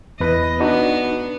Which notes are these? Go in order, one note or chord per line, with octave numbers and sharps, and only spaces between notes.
E2 B4 D#5
B3 D4 D#4 F#4